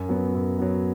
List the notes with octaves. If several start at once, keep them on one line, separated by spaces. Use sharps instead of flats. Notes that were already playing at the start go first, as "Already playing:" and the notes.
Already playing: F#2
F#3 B3
F#2
F#3 B3